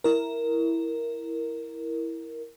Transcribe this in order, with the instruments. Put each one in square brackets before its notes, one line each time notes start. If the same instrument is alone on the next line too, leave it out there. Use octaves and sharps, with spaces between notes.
[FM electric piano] E4 A#4